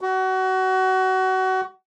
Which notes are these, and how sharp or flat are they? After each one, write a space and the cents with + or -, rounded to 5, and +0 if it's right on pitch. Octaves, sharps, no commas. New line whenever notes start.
F#4 +25